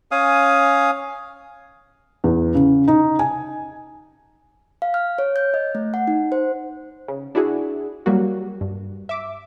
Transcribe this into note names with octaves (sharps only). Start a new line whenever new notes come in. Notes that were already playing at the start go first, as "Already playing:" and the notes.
C#4 F5 G#5 D#6
E2
C#3
D#4
G#5
F5
F6
C#5
G6
D#5
A3
F#5
D#4
C5
C#3
D4 E4 F#4 G#4
F#3 G3 A#3 F#4
G2
E5 D6